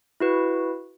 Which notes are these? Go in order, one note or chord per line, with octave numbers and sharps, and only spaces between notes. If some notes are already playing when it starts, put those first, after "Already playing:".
E4 F#4 B4